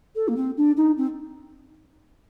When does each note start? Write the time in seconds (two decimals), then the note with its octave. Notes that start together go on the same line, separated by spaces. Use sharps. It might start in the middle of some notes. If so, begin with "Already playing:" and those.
0.15 A4
0.28 A#3
0.36 C4
0.57 D4
0.77 D#4
0.97 C4